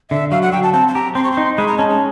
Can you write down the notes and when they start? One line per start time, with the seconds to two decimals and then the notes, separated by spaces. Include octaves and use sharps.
0.10 D3 E5
0.31 F#3 F5
0.42 F#5
0.52 F#3 G5
0.63 A5
0.74 C4 A5
0.88 A5
0.95 G4 A#5
1.15 C4 C6
1.24 C#6
1.32 C6
1.37 D#4
1.58 G#3 B5
1.68 A#5
1.78 C#4 A5
1.89 A5